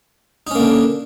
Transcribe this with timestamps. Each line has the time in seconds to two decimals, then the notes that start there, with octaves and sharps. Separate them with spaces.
0.47 D#4
0.51 C#4
0.55 A#3
0.60 D3